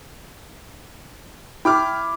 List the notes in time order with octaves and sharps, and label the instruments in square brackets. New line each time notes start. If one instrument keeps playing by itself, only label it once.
[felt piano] E4 [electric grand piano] G5 D6 F6